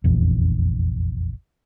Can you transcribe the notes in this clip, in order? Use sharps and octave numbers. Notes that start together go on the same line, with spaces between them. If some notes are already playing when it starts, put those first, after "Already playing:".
F1 A#1 E2